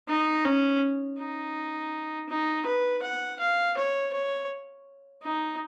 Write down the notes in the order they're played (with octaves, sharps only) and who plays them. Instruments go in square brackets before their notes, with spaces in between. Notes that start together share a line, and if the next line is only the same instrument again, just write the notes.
[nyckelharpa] D#4
C#4
D#4
D#4
B4
F#5
F5
C#5
C#5
D#4